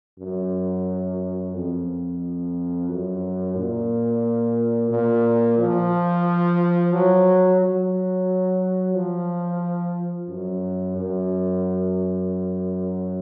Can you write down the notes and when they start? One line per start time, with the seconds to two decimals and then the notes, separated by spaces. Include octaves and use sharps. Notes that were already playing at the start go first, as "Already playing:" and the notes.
0.19 F#2
1.55 F2
2.88 F#2
3.56 A#2
4.90 A#2
5.58 F3
6.93 F#3
7.60 F#3
8.94 F3
10.29 F#2
10.97 F#2